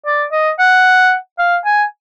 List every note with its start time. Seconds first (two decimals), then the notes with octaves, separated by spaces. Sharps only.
0.06 D5
0.32 D#5
0.59 F#5
1.39 F5
1.65 G#5